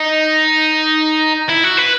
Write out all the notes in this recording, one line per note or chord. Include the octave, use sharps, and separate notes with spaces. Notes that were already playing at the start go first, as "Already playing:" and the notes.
Already playing: D#4
E4
F#4
B4